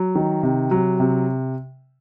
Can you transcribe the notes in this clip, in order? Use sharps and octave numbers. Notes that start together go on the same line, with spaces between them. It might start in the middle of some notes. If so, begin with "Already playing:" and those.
Already playing: F#3
D#3
C3
F#3
C3